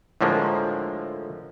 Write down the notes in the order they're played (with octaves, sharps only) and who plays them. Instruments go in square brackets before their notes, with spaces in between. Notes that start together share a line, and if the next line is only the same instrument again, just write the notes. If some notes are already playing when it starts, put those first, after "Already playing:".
[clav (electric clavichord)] A2 D3 F3 G#3 A#3